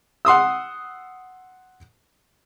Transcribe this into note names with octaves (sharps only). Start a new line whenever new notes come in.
F#5 C6 D#6 E6